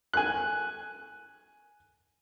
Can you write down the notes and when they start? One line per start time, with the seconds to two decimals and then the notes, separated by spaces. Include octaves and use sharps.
0.13 G#5 F#6